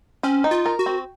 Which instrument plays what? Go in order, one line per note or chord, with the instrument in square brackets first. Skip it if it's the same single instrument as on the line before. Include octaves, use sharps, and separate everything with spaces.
[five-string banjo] C4 [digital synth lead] C#4
[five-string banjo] D#4
[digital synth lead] F4
[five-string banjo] A#4
[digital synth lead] F#4
[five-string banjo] C4